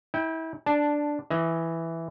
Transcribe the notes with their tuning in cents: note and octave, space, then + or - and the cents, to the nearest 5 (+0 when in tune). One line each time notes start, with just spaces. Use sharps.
E4 -30 G5 +10
D4 +0 A5 -5
E3 +0 D#5 +25